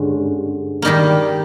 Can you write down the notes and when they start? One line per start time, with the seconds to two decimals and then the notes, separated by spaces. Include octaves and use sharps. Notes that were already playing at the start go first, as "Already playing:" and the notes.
Already playing: G2 D3 G#3 C#4
0.82 D#3 G3 A#3 D#4 G4